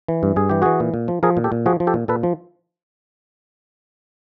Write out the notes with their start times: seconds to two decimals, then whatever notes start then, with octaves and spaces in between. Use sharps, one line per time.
0.08 E3
0.23 G2
0.36 G2 G#4
0.50 E3 G4
0.62 E3 F#4 G#4
0.80 A#2
0.94 A#2
1.08 F3
1.23 F3 G#4 A#4
1.37 A#2
1.44 G4 A4
1.52 A#2
1.66 F3 F#4 G#4
1.80 F3
1.87 G4 A4
1.94 A#2
2.08 A#2 A4 B4
2.23 F3